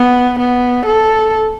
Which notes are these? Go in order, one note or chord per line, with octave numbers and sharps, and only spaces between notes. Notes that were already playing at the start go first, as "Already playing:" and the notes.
Already playing: B3
B3
A4